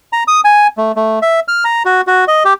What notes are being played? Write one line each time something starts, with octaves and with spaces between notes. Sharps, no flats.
A#5
D#6
G#5
A3
A3
E5
F6
A#5
F#4
F#4
D#5
G4